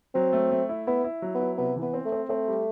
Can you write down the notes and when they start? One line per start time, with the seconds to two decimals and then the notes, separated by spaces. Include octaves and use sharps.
0.15 F#3 C4
0.33 A3
0.51 A3
0.69 E4
0.87 B3 E4
1.04 E4
1.22 F#3
1.35 B3
1.40 E4
1.58 C3 B3
1.76 E3
1.82 B3
1.94 C4
2.05 A3
2.12 C4
2.29 A3 C4
2.48 G3